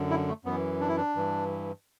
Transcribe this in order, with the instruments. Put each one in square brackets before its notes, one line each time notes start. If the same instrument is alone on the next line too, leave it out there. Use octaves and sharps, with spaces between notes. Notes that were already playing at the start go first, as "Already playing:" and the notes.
Already playing: [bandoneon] F#2 D3
E4
A3
F#2 E3 B3
D4
E4
D4
G2 E3